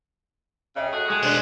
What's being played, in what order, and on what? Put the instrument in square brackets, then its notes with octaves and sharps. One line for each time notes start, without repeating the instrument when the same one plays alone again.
[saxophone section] C#3 [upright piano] D#5 E5 G5
[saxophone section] A3 F#4 G#4
[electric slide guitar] G#3 [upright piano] F#6 C#7 D#7
[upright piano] E1 D4 F#6 [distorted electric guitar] B3 C5